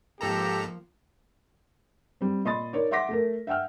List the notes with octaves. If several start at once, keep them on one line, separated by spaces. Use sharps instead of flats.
G#2 F3 A#3 G4 A4 A#5
G3 C4
A#2 D#5 B5 C6 D#6 A6
D#4 A#4 C#5 D5
E5 F#5 C6 D6 A#6 B6
A3 A4 A#4
E5 F#5 G5 E6 F6